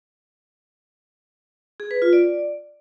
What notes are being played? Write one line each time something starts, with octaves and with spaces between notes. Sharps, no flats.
G#4
B4
F4
D5